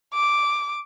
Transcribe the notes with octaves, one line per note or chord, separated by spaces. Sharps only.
D6